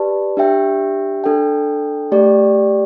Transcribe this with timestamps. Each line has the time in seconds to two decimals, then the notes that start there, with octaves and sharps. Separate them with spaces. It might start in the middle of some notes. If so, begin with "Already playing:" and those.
Already playing: G4 B4 D5 A5
0.37 D4 G4 E5 G5
1.24 D4 A4 G5
2.12 A3 G4 D5 G5